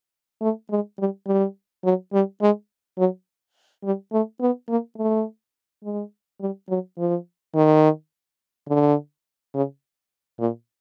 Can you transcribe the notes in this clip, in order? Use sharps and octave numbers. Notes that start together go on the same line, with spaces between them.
A3
G#3
G3
G3
F#3
G3
G#3
F#3
G3
A3
B3
A#3
A3
G#3
G3
F#3
F3
D#3
D3
C#3
A#2